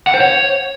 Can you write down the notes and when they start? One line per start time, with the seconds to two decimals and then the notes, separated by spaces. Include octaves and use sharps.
0.07 F#5
0.14 C5
0.21 C#5